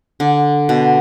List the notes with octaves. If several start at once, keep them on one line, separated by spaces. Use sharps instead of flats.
D3
B2